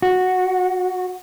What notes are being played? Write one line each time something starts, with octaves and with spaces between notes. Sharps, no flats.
F#4